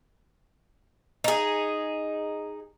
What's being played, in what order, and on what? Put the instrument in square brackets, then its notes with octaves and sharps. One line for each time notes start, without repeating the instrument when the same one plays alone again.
[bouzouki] D#4 G#4